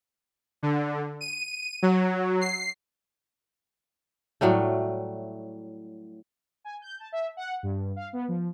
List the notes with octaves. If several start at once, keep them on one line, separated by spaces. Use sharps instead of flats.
D3
D#7
F#3
C7
A2 F#3 G3 A3
G#5
G6
A5
E5
F#5
G2
F5
B3
F3